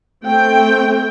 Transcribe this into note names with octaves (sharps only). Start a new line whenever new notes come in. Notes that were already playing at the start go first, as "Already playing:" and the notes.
A3 C4 G5